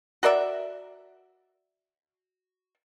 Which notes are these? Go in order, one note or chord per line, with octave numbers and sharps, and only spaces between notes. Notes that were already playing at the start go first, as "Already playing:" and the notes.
F#4 A#4 D5 E5